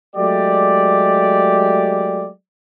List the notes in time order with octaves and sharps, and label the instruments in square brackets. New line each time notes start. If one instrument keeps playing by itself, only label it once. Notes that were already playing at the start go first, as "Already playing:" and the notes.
[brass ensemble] F#3 G#3 A3 G4 D5